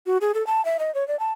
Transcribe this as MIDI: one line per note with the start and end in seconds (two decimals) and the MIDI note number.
0.06 0.18 66
0.21 0.32 68
0.34 0.45 69
0.47 0.64 81
0.65 0.77 76
0.79 0.93 75
0.95 1.06 73
1.08 1.18 74
1.19 1.33 81